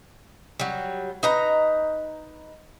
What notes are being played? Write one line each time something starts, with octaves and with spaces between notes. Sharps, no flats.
F#3 G3
D#4 B4 A#5